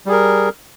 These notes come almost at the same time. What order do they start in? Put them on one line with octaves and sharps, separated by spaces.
G3 G#4 A#4